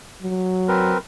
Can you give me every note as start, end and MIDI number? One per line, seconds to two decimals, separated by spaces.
0.22 0.95 54
0.68 0.98 60
0.68 0.98 70
0.68 0.98 71